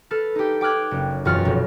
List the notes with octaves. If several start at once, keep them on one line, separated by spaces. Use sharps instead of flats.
A4 B4 F6
D#4 G4
G5 D6 F6 F#6 G#6
F#1
E1 F#2 E3 F4 F#4 F6
F1 B2